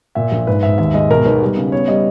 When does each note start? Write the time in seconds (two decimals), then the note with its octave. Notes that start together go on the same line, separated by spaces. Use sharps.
0.15 A#2 E5
0.32 A#1
0.47 G#2 B4
0.63 G#2 E5
0.78 D#2 E5
0.94 G#3 D#5
1.11 B2 A#4
1.25 B1 B4
1.42 G3
1.57 C#3
1.72 B3 C#5
1.88 G3 D#5